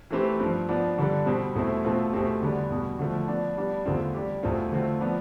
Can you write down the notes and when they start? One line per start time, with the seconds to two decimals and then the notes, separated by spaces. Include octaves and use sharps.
0.10 E3 A3 C4 G4 B4
0.40 G2 F3 C4
0.69 F3 B3 D4
0.97 G2 D3 G3 D4 A4
1.26 B2 G3 C4
1.55 E2 B2 A3 C4 E4
1.84 B2 A3 C4 F4
2.13 E2 B2 A3 C4 G4
2.41 E2 D3 G3 B3 D4
2.70 E2 B2 G3
2.99 D3 F3 A3
3.28 F3 B3 D4
3.57 G3 B3 D4
3.86 E2 D3 A3 C4 F4
4.14 G3 D4 G4
4.43 E2 B2 A3 C4 F4
4.72 D3 A3 C4 F4
5.00 F3 B3 D4